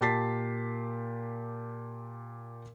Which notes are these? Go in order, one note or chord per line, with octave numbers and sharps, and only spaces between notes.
A#2 G4 A5 A6 B6 C7